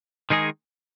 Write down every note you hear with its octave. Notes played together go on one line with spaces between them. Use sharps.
D#3 G#3 D#4 G#4